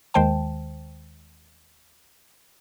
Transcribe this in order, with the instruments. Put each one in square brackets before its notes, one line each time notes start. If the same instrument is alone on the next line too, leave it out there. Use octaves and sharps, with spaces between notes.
[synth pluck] D#2 D#3 G#3 C5 G5 A5